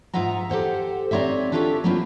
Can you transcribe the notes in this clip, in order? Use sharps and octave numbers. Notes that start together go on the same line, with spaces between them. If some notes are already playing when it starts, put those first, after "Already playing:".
G#2 D#4 F4 E5 F#5 A#5
G4 A4 C5 F#5
C4 D#4 C#5 D5 E5
D4 F4 G4 A4 C#5 E5
F#3 A3 A#3 C4 E4 F4